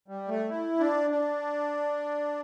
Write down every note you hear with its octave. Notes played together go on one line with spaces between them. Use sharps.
G3
A3
E4
D4
D4